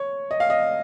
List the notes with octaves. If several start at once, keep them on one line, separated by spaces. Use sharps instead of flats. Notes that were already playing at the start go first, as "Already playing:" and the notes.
Already playing: C#5
D#5
F5
D#5